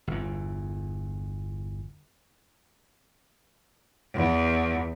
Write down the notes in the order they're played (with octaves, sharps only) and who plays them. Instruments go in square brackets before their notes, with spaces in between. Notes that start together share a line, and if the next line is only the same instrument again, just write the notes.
[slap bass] G1 E2
[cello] E2